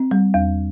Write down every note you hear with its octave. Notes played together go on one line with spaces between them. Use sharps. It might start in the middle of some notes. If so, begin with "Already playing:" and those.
Already playing: C4
G3
E2